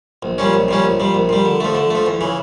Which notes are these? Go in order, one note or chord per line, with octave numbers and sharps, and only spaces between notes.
A#1
A#2 G3 C#4
A#1
A#2 G3 C#4
A#1
A#2 G3
A#1
A#2 G3
D3
F3 A3
D3
F3 A3
E2
C#3 E3